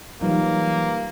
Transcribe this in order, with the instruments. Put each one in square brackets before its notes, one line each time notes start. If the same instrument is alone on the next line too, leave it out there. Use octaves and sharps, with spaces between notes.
[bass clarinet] E3 [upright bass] F#3 [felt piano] G3 D#4 F4 [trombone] A#3